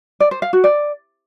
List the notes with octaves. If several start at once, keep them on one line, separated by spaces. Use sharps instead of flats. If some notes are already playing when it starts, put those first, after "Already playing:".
D5
C5
F5
F#4
D5